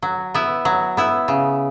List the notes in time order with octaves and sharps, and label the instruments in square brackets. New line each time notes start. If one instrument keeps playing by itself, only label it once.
[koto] F#3
B3 E4
F#3
B3 E4
C#3